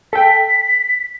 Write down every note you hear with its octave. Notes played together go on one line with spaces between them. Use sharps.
A4 G5 B6